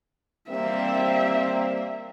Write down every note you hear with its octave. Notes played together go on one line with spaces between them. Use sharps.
G3 A#3 C4 E5